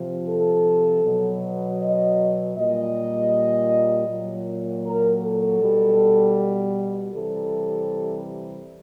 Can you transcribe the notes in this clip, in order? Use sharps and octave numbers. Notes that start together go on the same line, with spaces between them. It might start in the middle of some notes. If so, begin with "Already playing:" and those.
Already playing: C3 F3
A4
B2 F#3
D#5
A#2 G3 D#5
A#2 F#3
A#4
A4
B2 G3
C3 E3 G3 A4